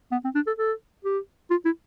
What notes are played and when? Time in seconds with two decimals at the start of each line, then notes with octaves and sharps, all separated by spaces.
0.12 B3
0.24 C4
0.35 D4
0.47 A4
0.59 A4
1.05 G4
1.51 F4
1.65 E4